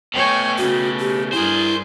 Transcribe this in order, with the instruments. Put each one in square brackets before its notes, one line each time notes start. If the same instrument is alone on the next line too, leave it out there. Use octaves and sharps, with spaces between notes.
[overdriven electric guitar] B2 A3 [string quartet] C#5 G5 G#5
[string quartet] C#3 [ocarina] F#4
[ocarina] G4
[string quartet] G2 G#4 [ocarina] E4 [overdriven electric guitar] A#4 C5